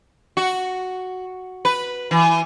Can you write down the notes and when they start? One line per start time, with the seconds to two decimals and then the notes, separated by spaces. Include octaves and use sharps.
0.37 F#4
1.65 B4
2.11 E3